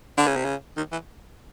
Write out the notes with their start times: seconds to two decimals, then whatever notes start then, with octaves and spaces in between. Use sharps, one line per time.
0.18 D3
0.27 C#3
0.36 C3
0.45 C#3
0.77 D#3
0.92 E3